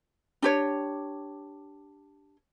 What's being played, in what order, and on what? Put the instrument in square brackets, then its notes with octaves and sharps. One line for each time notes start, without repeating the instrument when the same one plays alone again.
[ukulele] D4 G4 C#5